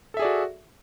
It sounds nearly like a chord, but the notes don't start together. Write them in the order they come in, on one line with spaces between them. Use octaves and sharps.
A4 E5 G#4 D5 F#4